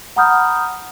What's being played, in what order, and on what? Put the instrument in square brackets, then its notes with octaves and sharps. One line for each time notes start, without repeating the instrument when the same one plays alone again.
[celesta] F#5 A#5 B5 D#6 F6 G6